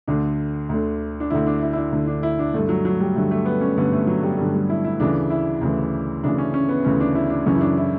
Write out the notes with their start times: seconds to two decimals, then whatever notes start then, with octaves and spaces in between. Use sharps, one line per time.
0.08 D2 D3 D4
0.69 D2 D3
1.20 D4
1.30 D2 D3 E4
1.47 D4
1.62 E4
1.73 E4
1.77 D4
1.92 D2 D3
2.07 D4
2.23 E4
2.39 D4
2.54 G2 D3 A3
2.69 F#3
2.85 F#3
3.00 G3
3.16 G2 D3 A3
3.31 A3
3.46 B3
3.61 C#4
3.78 G2 D3 B3
3.93 A3
4.07 F#3
4.23 G3
4.38 G2 D3 G3
4.54 G3
4.70 E4
4.84 E4
4.99 D2 C#3 E3 D4
5.30 E4
5.61 D2 C#3 E3
6.23 D2 C#3 E3 D4
6.38 C#4
6.54 C#4
6.69 B3
6.84 D2 C#3 E3 C#4
7.00 D4
7.15 E4
7.30 D4
7.46 F#2 C#3 E3 C#4
7.55 E4
7.61 D4
7.77 E4